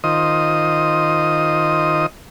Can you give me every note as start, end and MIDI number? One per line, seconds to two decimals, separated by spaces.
0.04 2.06 51
0.04 2.06 65
0.04 2.06 72
0.04 2.06 75
0.04 2.06 87